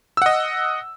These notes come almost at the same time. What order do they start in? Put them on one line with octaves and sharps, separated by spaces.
E6 F#5 D#5